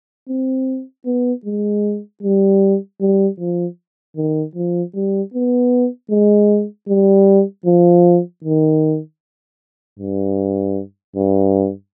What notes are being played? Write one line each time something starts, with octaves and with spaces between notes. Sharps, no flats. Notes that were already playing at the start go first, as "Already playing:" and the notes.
C4
B3
G#3
G3
G3
F3
D#3
F3
G3
B3
G#3
G3
F3
D#3
G2
G2